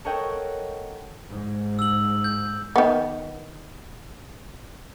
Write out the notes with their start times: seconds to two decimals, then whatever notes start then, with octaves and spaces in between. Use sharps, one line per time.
0.05 A4 A#4 C#5 D#5 F#5 G5
1.27 G#2
1.79 E6 F#7
2.24 G6
2.76 D#3 B3